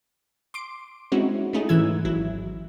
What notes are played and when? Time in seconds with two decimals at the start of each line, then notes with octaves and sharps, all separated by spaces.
0.54 C6 D6 D7
1.12 G#3 C4 C#4 D#4 E4 F#4
1.53 A3 C#4 D#4 E4 G#4
1.69 G#2 E3 E4 E6 G#6
2.05 G#1 F#3 E4